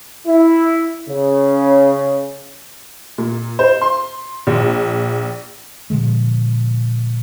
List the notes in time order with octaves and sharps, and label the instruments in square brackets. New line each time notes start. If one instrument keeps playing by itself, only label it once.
[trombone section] E4
C#3
[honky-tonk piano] A#2
C5
C6
A#1
[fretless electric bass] A#2 D3 F3 G#3